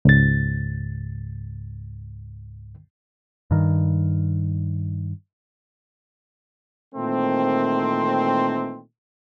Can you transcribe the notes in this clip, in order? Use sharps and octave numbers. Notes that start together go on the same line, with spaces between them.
C#2 G#2 A6
G2 D#3
A#2 D#3 E3 A3 C4